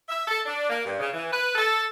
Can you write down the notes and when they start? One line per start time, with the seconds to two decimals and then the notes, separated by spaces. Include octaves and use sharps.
0.08 E5
0.27 A4
0.45 D4
0.70 A#3
0.84 G2
0.99 C#3
1.12 E3
1.31 B4
1.55 A4